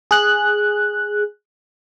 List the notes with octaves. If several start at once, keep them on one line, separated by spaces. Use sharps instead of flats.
G#4 F#6